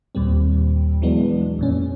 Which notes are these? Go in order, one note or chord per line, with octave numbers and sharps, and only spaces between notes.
D#2 A#2 G3 C4
E3 F#3 G#3 B3 D4
F2 A#2 C#4